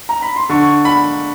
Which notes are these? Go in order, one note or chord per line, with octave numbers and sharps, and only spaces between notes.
A#5
B5
C6
D3 C#6
B5